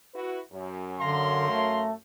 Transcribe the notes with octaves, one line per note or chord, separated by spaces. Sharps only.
E4 F#4 B4
F#2
D3 F5 A#5 C6
A3